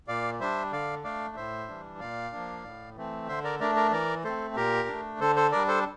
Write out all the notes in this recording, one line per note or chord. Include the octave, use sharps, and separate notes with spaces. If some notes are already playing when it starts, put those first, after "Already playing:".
A#2 D5 F5
G3 D4 C5 E5
D3 D5 F5
A3 D4 D5 F5
A2 C5 E5
E3 G3 D4
A#2 D5 F5
F3 A#3 D4
A2
E3 A3 C4
D3 C5 E5
A#4 D5
A3 D4 A#4 D5
A#4 D5
E3 A#4 D5
A3 C4 A4 C5
A#2 G4 A#4
A3 D4
D3 A4 C5
A4 C5
G3 D4 A#4 D5
A4 C5